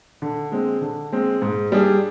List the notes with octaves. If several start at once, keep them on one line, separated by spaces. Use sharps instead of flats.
D3
G#3 C4
D3
G#3 C4
G#2
G3 D4 G#4